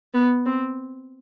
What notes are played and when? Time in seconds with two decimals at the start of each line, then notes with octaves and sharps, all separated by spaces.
0.14 B3
0.46 C4